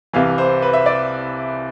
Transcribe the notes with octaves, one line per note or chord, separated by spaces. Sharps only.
C2 C3 E3 F5
C5
B4
E5
D5